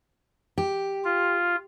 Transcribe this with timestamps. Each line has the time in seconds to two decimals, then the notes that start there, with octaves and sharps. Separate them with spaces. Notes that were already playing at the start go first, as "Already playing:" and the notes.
0.58 G4
1.05 F4